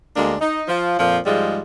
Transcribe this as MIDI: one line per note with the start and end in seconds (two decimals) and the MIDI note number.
0.16 0.36 38
0.16 0.36 56
0.16 0.36 58
0.16 0.36 62
0.41 0.62 63
0.68 0.98 53
1.00 1.19 41
1.00 1.19 46
1.00 1.19 53
1.26 1.61 44
1.26 1.61 53
1.26 1.61 55
1.26 1.61 56